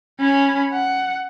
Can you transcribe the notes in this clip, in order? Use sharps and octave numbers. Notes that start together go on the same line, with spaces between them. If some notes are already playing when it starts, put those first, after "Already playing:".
C#4 B5
F#5